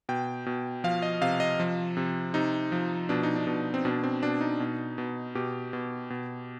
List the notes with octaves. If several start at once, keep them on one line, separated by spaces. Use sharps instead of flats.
B2 G5
B2
F3 F5
D#5
C3 F5
D#5
F3
C3
C3 D#4
F3
B2 D4
D#4
D4
B2
C4
B2 D4
C4
B2 D4
D#4
B2
B2
B2 G4
B2
B2